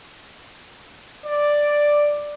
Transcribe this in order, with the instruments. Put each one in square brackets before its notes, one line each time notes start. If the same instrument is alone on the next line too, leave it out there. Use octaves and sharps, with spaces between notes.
[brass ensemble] D5